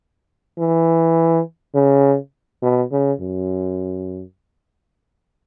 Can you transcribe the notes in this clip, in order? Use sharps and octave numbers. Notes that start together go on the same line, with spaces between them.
E3
C#3
B2
C#3
F#2